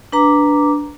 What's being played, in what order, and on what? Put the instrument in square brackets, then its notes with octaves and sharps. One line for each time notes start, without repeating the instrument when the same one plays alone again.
[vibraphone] D4 B4 A#5 D6